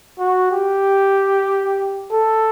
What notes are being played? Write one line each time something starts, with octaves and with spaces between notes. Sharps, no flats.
F#4
G4
A4